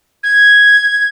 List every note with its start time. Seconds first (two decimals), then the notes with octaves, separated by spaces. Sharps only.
0.23 G#6